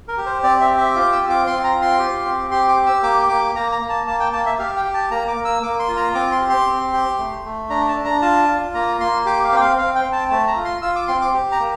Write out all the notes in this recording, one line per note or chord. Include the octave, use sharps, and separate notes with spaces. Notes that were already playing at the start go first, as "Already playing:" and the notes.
A#4
G4
C5
C4 D5
E5
G4
E5
F4 D6
E6
C4
D6
C4 C6
A#5
F4
C6
G4
C4
G4 C6
D6
G4
E6
A#3 D6
A#3 D6
A#3 A#5
A#5
A#3
A5
A#3 A5
G5
A#3 A5
E5
G4 F5
G5
G4
A5
A#3 A#5
D6
A#3
E6
A#3 D6
C6
F4
A#5
C4 D6
C6
G4
C6
C4
G4
A3
A3
D4 A#5
A5
D4
A#5
F4 A5
F4
A#3 A#5
A#3 C6
G4 D6
F5
C4 G5
F5
C4 F5
G5
C4
A5
A3 A5
A#5
F4
C6
F4 E6
D6
C4 C6
D6
G4
A#5
A#3